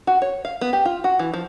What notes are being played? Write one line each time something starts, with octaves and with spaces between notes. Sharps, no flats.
F#4
C#5
F5
B3
G4
F4
F#4
E3
F3